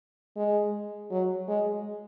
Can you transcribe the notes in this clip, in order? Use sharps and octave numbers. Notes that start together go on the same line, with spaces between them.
G#3
F#3
G#3